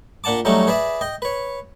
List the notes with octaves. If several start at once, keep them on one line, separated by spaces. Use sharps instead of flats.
A#2 D4 F#5 A5 D6
F#3 G3 A3 C#4 D#4 C#5
G#4 B4 D5 E5
D#5 G5
B4 C#5